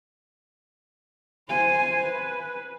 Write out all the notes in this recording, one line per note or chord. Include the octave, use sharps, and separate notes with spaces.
C5 G#5
B4